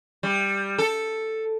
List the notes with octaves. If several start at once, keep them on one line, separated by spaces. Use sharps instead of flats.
G3
A4